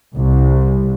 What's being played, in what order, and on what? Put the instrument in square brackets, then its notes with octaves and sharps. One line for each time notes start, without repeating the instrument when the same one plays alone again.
[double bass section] C2